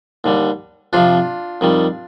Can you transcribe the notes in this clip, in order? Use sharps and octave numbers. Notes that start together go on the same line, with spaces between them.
D#2 D3 G3
F2 C3 F3 D4 F4
F2 D#3 G3